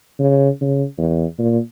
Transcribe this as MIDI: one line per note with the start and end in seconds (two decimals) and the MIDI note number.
0.19 0.49 49
0.61 0.84 49
0.98 1.25 40
1.39 1.58 46